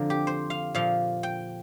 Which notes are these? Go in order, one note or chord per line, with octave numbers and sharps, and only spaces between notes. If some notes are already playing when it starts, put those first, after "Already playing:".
Already playing: F2 D3 F3 A#4
G4
C5
F5
A#2 F3 F5
G5